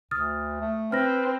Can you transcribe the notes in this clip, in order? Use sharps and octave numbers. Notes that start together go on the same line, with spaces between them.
D2 D#6 F6 A6
A3
C4 B4 F6 A#6